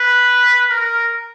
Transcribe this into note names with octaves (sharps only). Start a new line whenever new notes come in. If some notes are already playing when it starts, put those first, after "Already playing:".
Already playing: B4
A#4